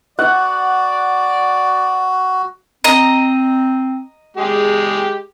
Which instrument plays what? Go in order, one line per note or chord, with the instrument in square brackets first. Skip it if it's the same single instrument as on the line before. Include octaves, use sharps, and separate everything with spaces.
[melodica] F#4 [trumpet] D5 [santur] F#5
[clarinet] C4 [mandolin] D#5 A#5
[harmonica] G#3 G4 [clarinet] G#4